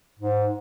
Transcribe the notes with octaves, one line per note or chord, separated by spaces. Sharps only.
G#2